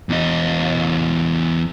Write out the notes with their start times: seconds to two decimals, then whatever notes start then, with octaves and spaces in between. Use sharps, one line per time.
0.09 E2 D#5